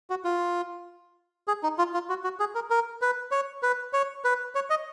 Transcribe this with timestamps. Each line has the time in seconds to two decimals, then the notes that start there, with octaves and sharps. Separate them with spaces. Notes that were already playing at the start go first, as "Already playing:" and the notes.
0.10 F#4
0.25 F4
1.48 G#4
1.63 D#4
1.78 F4
1.94 F4
2.09 F#4
2.24 F#4
2.40 G#4
2.55 A#4
2.70 A#4
3.02 B4
3.31 C#5
3.63 B4
3.93 C#5
4.24 B4
4.55 C#5
4.70 D#5